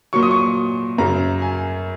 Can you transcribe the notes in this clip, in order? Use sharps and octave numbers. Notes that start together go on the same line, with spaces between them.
A#2 F#3 C#6
D#6
C#6
F#2 C#3 F#3 A#5
G#5